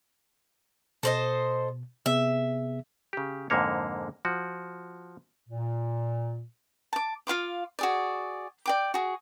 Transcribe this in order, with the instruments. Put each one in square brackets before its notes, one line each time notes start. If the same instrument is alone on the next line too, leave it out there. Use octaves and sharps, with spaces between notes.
[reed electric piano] B2 [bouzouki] A4 C5 D#5
[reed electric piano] C3 B3 G#4 [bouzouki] E5
[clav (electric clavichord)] C#3 G4
F2 G#2 D3 A#3 C#5
F3 F#4
[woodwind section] A#2
[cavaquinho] A5 D6
F4 F5 C6 D6
F#4 G#4 D5
D5 G5 D6
F#4 G#4